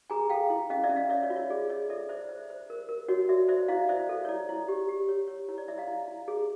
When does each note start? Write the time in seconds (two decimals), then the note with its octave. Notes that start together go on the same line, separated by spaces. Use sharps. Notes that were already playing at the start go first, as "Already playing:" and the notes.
0.10 G#4 G#5 A#5
0.30 A4 F5 G5
0.50 E4
0.70 C#4 D#5 F5
0.84 D5 E5
0.89 C#4
0.96 D#5 F5
1.09 C#5 D5 E5
1.23 C#5 D#5
1.30 F4
1.36 C#5
1.50 G#4 D5
1.69 G#4 C#5 D#5
1.90 A4 D5 E5
2.09 C5 D5 E5
2.29 C5
2.50 C5
2.70 A#4
2.89 A#4
3.09 F#4 C#5 D#5
3.29 F#4 D5 E5
3.48 C5 D5 E5
3.68 E4 D#5 F5
3.89 C5 D5 E5
4.09 A4
4.25 C#5
4.28 E4 D5
4.49 E4
4.68 G4
4.89 G4
5.09 C#5
5.28 C#5
5.48 E4 C#5
5.58 D5
5.68 E4 D5 E5
5.78 D#5 F5
5.88 E4
6.08 E4
6.28 G#4